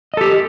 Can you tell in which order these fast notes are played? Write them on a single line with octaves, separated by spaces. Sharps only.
D#5 A4 G4